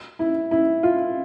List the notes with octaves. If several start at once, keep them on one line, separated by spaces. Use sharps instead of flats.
E4
E4
F4